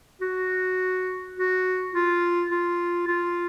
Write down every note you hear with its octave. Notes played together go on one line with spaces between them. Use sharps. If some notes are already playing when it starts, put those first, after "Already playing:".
F#4
F#4
F4
F4
F4